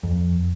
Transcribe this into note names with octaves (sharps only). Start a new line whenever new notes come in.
F2